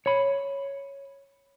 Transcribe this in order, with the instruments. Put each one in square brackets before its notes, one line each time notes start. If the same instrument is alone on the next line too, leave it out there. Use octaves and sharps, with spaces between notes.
[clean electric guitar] C#5 B5